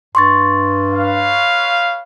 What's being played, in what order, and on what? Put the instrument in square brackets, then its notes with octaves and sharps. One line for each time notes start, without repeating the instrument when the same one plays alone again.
[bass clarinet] G2 [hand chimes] C6 C#6 A6
[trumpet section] B4 C#5 F5